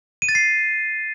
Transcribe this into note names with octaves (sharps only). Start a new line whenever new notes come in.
D#7
A6
C7